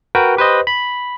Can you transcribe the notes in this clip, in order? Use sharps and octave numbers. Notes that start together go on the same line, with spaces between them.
F#4 A#4 B4 G5
G4 B4 C5 D#5
B5